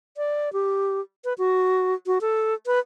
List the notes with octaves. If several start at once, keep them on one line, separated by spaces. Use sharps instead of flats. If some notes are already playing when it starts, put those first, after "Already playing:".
D5
G4
B4
F#4
F#4
A4
B4